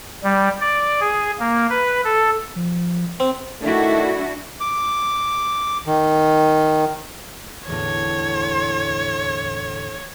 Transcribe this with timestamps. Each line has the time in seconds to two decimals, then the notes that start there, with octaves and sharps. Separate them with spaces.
0.23 G3
0.61 D5
1.01 G#4
1.39 A#3
1.70 B4
2.04 A4
2.56 F3
3.20 C4
3.61 D#3 A3 D4 E4 F#4
4.61 D6
5.86 D#3
7.68 E2 A2 D3 C#5